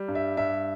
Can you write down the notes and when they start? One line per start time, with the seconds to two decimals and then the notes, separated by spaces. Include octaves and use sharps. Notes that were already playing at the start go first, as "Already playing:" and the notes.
Already playing: G3
0.08 G2
0.15 E5
0.37 G2 E5